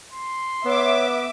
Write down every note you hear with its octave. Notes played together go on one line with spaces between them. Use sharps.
C6
B3 C#5 E5 D6